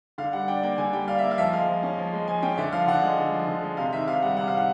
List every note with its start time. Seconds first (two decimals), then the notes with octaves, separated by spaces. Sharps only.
0.18 D3 F5
0.33 G3 F#5
0.48 D4 G5
0.63 A#3 G5
0.78 D3 G#5
0.93 G3 G5
1.08 D4 F5
1.18 E5
1.23 A#3
1.31 F5
1.38 F3 E5
1.53 G#3 F5
1.68 F3
1.83 C#4
1.98 F3
2.13 G#3
2.28 F3 G#5
2.42 C#4 G5
2.57 D3 E5
2.72 F3 F5
2.87 D3 F#5
3.03 G#3
3.17 D3
3.33 F3
3.48 D3
3.63 G#3
3.77 C3 F5
3.92 D#3 E5
4.07 C3 F5
4.22 G3 F#5
4.37 C3 F#5
4.48 F5
4.52 D#3
4.58 F#5